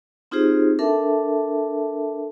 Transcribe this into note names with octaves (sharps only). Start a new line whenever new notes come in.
C4 D#4 F4 G4 G#4 C5
D4 A4 A#4 E5 A5